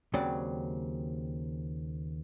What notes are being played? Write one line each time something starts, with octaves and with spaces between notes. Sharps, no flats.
D#2 C#3 F#3 C4 D5